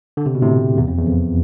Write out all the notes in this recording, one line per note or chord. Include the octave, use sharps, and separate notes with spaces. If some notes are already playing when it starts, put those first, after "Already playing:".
D3
C3
B2
A2 C3
E2
F2
E2
F2